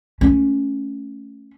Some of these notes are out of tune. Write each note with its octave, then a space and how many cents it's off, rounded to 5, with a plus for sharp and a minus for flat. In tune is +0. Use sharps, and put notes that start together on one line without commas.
A3 +0 C#4 +0